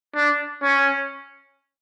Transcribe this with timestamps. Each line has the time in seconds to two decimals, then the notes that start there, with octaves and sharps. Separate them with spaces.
0.15 D4
0.62 C#4